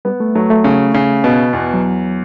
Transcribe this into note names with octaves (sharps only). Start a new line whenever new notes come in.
G3 B3
A3
F#3 A3
A3
C#3
C#3
B2
E2
F#3